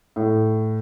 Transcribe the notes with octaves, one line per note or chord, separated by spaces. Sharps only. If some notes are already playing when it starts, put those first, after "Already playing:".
A2